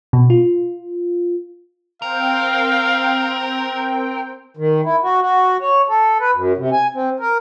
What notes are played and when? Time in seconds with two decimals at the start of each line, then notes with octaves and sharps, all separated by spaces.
0.13 B2
0.30 F4
2.02 C4 A#4 F5 G5
4.57 D#3
4.84 E4
5.03 F#4
5.22 F#4
5.62 C#5
5.89 A4
6.21 B4
6.34 F#2
6.57 C3
6.72 G#5
6.94 C4
7.20 A#4